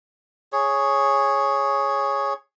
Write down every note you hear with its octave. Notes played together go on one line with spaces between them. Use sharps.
G#4 C#5